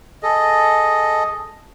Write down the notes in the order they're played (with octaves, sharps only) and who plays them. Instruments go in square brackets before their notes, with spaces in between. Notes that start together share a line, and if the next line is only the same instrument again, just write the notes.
[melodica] G#4 A4 D#5